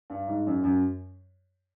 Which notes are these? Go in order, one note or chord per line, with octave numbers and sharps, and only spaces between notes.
G2
G#2
F#2
F#2